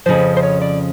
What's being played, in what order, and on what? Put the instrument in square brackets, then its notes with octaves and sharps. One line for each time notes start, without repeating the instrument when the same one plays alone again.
[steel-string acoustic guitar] F2 C#3 F3 [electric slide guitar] C5
[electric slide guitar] C5
C#5
D5